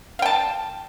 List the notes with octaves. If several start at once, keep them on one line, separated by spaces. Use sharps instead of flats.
F5 G5 A5